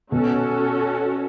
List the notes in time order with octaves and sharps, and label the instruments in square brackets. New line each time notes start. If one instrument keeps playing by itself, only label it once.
[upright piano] B2 [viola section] C#4 F#4 A4